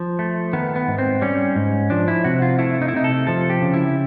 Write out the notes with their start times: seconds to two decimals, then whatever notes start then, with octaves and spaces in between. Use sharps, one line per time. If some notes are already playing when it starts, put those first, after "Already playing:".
Already playing: F3
0.19 A3
0.53 D#3 B3
0.76 B3
0.87 G#2
0.99 C4
1.22 G3 C#4
1.56 G#2
1.90 F3 D4
2.08 E4
2.24 C3 F#4
2.42 F4
2.59 A3 E4
2.81 D#4
2.88 E4
2.94 C3 D#4
3.04 A4
3.27 F3 A4
3.50 G4
3.62 C#3
3.74 E4